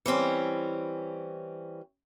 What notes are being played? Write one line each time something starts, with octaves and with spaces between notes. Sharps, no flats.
E3 G3 C4 C#4